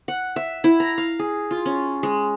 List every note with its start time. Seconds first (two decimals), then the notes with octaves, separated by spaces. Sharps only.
0.08 F#5
0.36 E5
0.64 E4
0.80 A#5
0.98 F5
1.19 G#4
1.51 F4
1.66 C#4
2.03 G#3